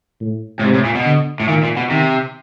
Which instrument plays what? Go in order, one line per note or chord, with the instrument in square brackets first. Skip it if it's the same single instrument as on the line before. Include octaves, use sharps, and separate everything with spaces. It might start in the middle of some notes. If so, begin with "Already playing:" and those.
[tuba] A2
[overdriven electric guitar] A2
[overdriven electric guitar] G#2 [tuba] C3
[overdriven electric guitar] A2
A#2
B2
[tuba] D3
[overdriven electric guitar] A2
[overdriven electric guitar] A#2 [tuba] D#3
[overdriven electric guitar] A#2
B2
[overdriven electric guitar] C3 [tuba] D#3